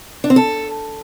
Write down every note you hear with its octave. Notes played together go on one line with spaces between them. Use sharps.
D4
C4
A4